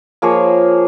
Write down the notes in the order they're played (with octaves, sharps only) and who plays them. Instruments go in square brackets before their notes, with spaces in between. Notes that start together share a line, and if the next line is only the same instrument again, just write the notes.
[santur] F3 A#3 G#4 C#5